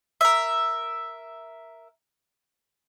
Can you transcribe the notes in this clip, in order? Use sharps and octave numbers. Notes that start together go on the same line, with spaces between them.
A#4 E5